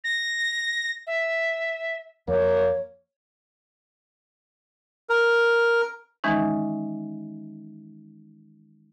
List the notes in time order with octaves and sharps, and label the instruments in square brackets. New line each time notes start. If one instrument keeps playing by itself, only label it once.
[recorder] A#6
E5
[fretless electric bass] F2 [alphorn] A#3 [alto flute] C#5
[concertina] A#4
[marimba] D#3 E3 G#3 C#4 D#4